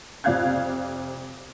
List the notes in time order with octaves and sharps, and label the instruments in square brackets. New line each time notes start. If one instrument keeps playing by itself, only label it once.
[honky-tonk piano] F2 C3 D5 F5 F#6 G#6